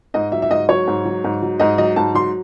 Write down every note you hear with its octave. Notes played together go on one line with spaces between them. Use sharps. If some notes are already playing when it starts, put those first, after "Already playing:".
G#2 D#5
F#3 E5
E5
G#2 D#5
F#3 C#5
G#2
F#3
G#2
F#3
G#2 D#5
F#3 D#5
G#2 A5
F#3 C6